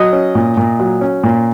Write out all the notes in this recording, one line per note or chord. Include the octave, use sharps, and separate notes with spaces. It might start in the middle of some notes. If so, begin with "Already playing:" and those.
Already playing: F#3 D#5
C#4
A#2
A#2
F#3
C#4
A#2